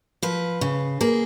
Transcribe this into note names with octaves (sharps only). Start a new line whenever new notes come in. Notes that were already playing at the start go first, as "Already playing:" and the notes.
F3 B4
C#3
A#3 G#4